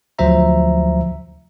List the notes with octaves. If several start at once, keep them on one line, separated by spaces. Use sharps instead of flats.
D2 F3 F#3 C5 E5 A#5